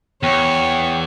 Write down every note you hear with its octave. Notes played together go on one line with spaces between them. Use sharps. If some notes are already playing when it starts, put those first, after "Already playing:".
E2 C#5 G5